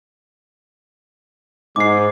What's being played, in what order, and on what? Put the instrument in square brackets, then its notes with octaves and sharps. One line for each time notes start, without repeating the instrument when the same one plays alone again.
[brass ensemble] G#2 [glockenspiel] D6 C7